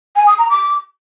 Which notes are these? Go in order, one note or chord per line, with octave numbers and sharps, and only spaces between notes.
G#5
D#6
A#5
D6